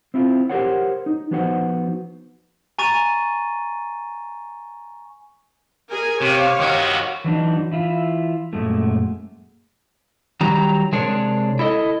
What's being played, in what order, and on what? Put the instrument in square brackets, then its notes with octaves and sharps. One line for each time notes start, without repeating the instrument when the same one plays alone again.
[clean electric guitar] C4 E4 F4
G4 G#4 A#4 C5 C#5 F#5
D#4
F3 B3 D#4 F#4 C5 F#5
[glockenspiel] G#5 A#5 C#6 A6 D#7
[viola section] G#4 A#4 G#5
[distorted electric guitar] C3 [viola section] G4 C#5 F5
[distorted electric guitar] D#3 F#4
[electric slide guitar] E3 F#3 D4 D#4
E3 E4 F4
F#2 A#2 G#3 A3
D#3 F#3 G3 G4 A#5
C3 G#3 D4 G#4 A#4 C#5
E4 A4 D#5